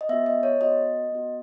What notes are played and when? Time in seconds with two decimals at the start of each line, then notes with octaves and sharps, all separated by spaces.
0.01 D#5
0.09 B3 F#4 E5
0.26 D#5
0.43 C#5
0.61 B3 F#4 D#5
1.12 B3 F#4